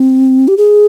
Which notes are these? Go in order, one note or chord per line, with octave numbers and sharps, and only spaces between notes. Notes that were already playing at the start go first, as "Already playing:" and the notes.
Already playing: C4
G4
G#4